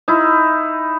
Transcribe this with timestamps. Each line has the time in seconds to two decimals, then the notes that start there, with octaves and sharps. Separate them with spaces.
0.08 D#4 E4